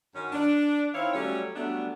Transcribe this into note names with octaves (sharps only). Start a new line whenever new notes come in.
F#2 D#3 C#4
D4
D#3 C4 E4 C#5 F5
F#3 G3 A3 C#4 C#5
F#3 G3 A3 B3 D4